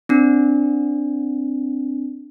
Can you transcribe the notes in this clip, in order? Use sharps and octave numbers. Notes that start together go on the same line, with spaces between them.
C4 D4